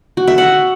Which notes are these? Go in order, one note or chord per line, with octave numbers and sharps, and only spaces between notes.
F#4
E5
F#5